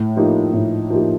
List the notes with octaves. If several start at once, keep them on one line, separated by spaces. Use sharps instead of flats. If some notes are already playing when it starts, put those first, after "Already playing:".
Already playing: A2
F3 A#3 D#4 G4
A2
F3 A#3 D#4 G4